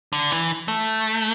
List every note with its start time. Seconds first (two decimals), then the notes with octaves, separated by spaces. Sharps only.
0.13 D3
0.31 E3
0.68 A3